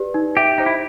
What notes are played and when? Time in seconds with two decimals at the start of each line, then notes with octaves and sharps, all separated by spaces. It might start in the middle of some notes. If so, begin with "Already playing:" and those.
Already playing: G4 B4 D5
0.14 D#4
0.37 G4 E5
0.58 D#4 C5
0.66 E4